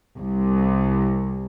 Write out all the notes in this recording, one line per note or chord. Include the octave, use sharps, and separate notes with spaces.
C2